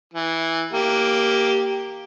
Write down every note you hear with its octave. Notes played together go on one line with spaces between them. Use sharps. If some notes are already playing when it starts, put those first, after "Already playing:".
E3
A#3 G4